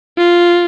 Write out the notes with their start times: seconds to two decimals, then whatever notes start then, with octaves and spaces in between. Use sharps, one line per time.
0.18 F4